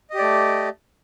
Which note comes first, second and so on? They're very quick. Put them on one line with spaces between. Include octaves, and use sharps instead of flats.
D#5 G4 D5 A3